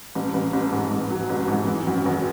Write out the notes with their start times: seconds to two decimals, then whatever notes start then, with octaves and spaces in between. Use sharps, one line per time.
0.15 A1
0.34 A1
0.53 A1
0.72 G#2
0.91 A1
1.10 F#3
1.30 A1
1.48 G#2
1.67 E3
1.87 F#2
2.05 G#1